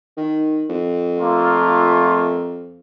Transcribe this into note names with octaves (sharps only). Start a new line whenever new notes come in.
D#3
F2
A3 A#3 F4